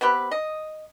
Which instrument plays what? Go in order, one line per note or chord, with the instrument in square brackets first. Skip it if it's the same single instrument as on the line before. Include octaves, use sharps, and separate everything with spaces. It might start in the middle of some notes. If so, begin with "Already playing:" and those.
[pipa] B3 C4 G4 B4
D#5